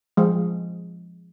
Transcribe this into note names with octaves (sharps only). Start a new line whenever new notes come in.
F3 G#3